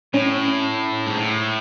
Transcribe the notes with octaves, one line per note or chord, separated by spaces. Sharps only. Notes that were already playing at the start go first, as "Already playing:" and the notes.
A2 C#4
G#2
A2